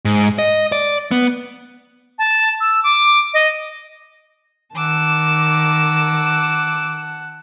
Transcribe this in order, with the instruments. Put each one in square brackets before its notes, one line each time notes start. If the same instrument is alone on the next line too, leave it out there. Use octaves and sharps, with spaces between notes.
[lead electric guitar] G#2
D#5
D5
B3
[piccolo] A5
E6
D6
D#5
[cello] D#3 [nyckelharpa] F#5 A5 [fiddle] D6 E6